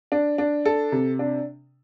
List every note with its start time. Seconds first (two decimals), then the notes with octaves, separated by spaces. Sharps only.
0.12 D4
0.38 D4
0.65 A4
0.92 C3
1.19 D4